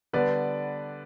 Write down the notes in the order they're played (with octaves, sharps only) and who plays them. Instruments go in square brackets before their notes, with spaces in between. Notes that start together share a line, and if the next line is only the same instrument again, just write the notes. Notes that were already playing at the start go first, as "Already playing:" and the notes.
[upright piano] D3 G3 B3 D4 [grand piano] B4 D5